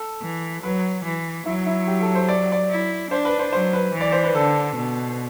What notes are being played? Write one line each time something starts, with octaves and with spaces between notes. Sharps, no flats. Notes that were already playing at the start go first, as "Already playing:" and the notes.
Already playing: A4
E3
F#3 B4
E3
F#3 E4
E4
G4
A4
C5
D5
D5
E4
D4 C5
B4
C5
F#3 C5
B4
E3
D5
C5
B4
D3 A4
B2